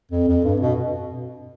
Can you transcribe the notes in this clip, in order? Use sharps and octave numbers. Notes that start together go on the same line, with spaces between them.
F2
F2
G2
B2